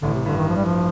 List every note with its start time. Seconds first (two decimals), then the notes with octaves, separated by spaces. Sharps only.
0.02 A1 A2 D3
0.14 C3
0.26 G2 D3
0.37 D#3
0.49 F3
0.56 G3
0.65 F3